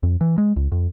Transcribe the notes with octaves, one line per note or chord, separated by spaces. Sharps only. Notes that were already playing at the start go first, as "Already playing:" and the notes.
F2
E3
G#3
C#2
F2